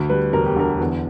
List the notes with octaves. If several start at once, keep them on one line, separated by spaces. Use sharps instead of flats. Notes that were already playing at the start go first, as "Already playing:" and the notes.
Already playing: D2
G3 B4
E1 A#4
G4
D3 A#4
E2